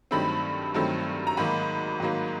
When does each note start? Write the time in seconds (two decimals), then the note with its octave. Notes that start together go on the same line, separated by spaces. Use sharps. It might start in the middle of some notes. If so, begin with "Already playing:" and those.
0.11 G2 D#3 F#3 A3 C4 B5
0.74 G2 D#3 F#3 A3 C4
1.27 A#5
1.37 G#2 D#3 F#3 A#3 B5
2.00 G#2 D#3 F#3 A#3